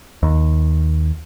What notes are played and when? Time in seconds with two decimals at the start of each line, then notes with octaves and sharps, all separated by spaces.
0.23 D#2